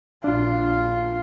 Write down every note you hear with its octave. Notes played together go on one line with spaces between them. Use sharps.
A#1 D4 F4